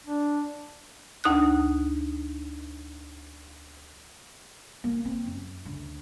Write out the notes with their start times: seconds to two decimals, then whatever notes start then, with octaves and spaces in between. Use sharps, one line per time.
0.06 D4
1.24 D2 D#4 D#6 F#6
4.84 A#3
5.05 C4
5.26 F#2
5.65 D2